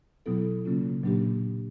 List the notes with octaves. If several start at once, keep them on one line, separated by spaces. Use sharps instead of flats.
B2 F#3 B3 E4 A4
C#3 F#3 A#3 C#4 F4
A#2 F#3 A#3 D4 G4